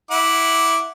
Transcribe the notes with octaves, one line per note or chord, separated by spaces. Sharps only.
E4 F#5 D6